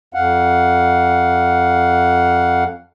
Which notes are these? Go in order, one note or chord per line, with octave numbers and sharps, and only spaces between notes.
F2 F5 F#5